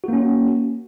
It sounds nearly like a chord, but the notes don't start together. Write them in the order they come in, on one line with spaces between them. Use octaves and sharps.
F#4 A#3 C#4